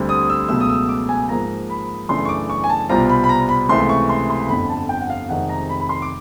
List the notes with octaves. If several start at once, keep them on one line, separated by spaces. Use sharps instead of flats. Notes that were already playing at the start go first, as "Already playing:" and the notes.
Already playing: D2 D3 G3 C4
D#6
E6
C#2 B2 F#3 A3 E6
D#6
E6
D6
G#5
G#2 F3 A#3 A#5
B5
F#2 C#3 E3 A3 D4 C6
C#6
D6
C#6
G#5
A5
C2 B2 G3 C4 F4 A#5
B5
B5
A#5
B5
C#2 C3 E3 A3 C6
C#6
C6
C6
G1 F2 D3 B5
A5
G5
F#5
F5
F1 F2 C3 D#3 G#3 F#5
A#5
B5
B5
C6
D6